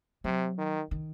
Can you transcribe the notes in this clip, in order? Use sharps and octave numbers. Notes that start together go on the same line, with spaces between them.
C3 F#3
D#3
D#3